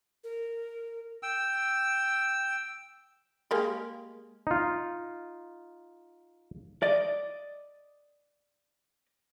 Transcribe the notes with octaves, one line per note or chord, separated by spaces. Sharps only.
A#4
G5 E6
G#3 A#3 G4
D#4 F4
D5 D#5